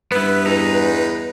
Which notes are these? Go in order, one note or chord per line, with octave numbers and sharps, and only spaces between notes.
G2 B3 E4 B4
E2 D#4